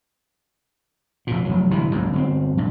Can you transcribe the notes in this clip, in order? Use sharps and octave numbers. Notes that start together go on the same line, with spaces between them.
F1 A#2
F1 F#3
G1 C3 E3
F#1 C#2 G#2
G1 D3 C4
A#1 G2